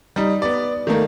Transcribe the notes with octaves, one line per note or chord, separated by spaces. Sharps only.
G3 D#4
B3 D5
D#3 A3 A#3